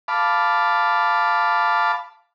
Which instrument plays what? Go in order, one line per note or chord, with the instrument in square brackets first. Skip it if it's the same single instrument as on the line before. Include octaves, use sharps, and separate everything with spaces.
[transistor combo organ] F5 A5 B5 D6